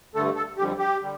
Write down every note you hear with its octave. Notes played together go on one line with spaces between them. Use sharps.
G2 D3 A3 A4
A4
F2 D3 G3 G4
G4
D3 G3